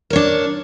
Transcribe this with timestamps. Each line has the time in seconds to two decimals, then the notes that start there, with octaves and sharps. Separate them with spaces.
0.10 A#4
0.13 C#5
0.16 D4